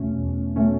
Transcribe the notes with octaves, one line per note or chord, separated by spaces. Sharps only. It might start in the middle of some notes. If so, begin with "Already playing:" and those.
Already playing: E2 B2 A3 C#4
E2
B2 A3 C#4